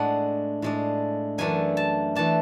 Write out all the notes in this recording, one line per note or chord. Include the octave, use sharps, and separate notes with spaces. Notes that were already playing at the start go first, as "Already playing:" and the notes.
Already playing: A2 G#3 D4 F#5
A2 G#3 D4
F#2 E3 A3 D4 G#5
A5
E3 A3 D4 A5